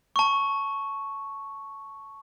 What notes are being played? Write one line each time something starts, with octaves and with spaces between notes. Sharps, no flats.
A5 C#6